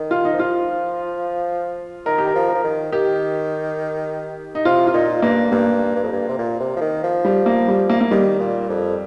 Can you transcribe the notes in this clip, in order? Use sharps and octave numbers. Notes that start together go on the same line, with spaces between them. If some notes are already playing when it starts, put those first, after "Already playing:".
Already playing: D#3
F4
D#4
F3
F4
D#3 A#4
G4
A#4
F3
A#4
F3
D#3
D#3 G4
D#4
C3 F4
F4
A#2 D#4
G2 A#3
G2 A#3
G2
F2
G2
C3
A#2
C3
F3
D#3
F3
G3
A#3
G3
A#3
A#3
D#3 G3
A#2
F2